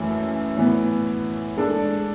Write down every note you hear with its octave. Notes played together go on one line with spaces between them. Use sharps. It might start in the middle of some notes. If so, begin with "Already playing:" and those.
Already playing: F#2 E3 A3 E4
A2 E3 B3
G#3 D4 A4